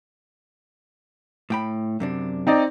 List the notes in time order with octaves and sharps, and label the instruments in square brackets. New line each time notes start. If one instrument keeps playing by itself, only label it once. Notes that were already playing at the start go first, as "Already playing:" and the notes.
[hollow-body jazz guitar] A2 G5 B5
F#2 C3 D4
[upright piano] C4 D#4 D5